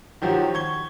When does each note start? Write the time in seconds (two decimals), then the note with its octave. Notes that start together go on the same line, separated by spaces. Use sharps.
0.22 D#3 F3 F#3 F#4 G4
0.54 C#6 G#6 G7